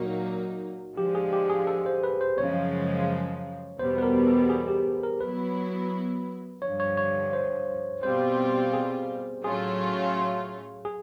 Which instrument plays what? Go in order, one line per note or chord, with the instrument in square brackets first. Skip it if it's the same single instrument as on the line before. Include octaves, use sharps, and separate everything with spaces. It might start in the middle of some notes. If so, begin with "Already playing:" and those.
Already playing: [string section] A#2 F#3 A#3 D#4 [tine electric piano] F#4
[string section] D3 F3 G#3 [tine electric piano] G4
[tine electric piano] G#4
G4
G#4
A4
C5
B4
C5
[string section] F#2 C#3 F3 G#3 [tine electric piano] C#5
[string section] E2 B2 G3 B3 [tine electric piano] C5
[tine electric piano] B4
A#4
A4
G#4
G4
A#4
[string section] F#3 B3 E4 [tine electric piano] B4
[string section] G2 D3 F3 [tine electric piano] C#5
[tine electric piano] C#5
C#5
C5
[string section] B2 G3 C4 F4 [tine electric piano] C5
[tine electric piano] G#4
[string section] A2 F#3 A3 C#4 F4 [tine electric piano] G#4
[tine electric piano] G#4